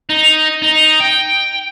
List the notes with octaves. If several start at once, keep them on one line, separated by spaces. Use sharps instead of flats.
D#4
D#4
G5